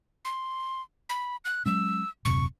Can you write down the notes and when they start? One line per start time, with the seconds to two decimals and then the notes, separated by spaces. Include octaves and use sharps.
0.25 C6
1.09 B5
1.45 F#6
1.66 F#3 G#3 C#4 E6
2.25 D#1 F#2 C3 C#6